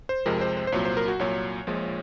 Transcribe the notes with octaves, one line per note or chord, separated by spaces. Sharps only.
C5
F2 C3 F3 G#3 A#4
C5
C5
C5
C2 A#2 F#3 C#5
C5
A#4
F#4
C2 A#2 F#3 C#5
A#1 A#2 F3 G#3